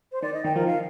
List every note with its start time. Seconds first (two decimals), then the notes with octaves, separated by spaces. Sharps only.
0.12 C5
0.22 D#3 D5
0.34 D#5
0.45 D#3 G5
0.56 F3 A#4
0.67 D#3 F5